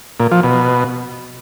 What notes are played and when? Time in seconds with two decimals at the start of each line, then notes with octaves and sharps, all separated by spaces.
0.20 A#2
0.31 F3
0.43 B2